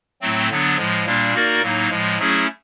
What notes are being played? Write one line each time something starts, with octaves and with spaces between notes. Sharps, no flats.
A2 F#3 A3 C4
D3 F#3 B3 D4
A2 F3 G#3
A#2 G3 A#3 D4
A#3 D#4 F#4 A#4 D5
A2 F#3 A#3 D#4
A2 F3 G#3
F#3 A3 C#4 E4 G#4